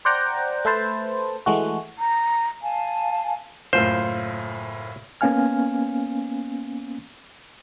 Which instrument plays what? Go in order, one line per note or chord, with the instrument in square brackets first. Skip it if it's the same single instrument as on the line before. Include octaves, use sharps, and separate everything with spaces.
[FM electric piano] C5 D5 F#5 G5 A#5
A3 A4 B4 C5 A5
E3 G#3 A3 F#4
[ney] A#5
[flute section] F5 G#5 A5
[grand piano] F#1 A2 F4 [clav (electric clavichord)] C5
[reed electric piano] A#3 B3 C#4 F5 G#5 F6